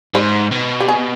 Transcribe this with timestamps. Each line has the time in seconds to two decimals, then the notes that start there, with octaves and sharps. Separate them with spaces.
0.15 G#2 C5
0.52 B2
0.80 G4
0.88 G#4